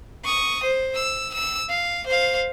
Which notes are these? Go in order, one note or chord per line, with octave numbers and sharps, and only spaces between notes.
C#6 D#6
C5
E6
E6
F5
C5 F5